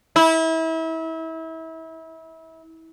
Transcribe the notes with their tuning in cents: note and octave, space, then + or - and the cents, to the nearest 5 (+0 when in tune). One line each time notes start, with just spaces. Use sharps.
E4 -30